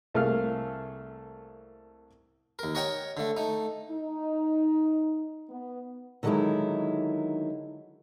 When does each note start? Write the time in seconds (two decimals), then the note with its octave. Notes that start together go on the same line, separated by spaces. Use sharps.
0.14 C2 A3 A#3 G#4 F5 F6
2.59 D#2 A#4
2.75 A#4 C#5 D#5 F#5 G5 A#5
3.17 D3 A3
3.37 A3 D#4
3.91 D#4
5.50 B3
6.23 D3 D#3 F#3 G#3 D#4 E4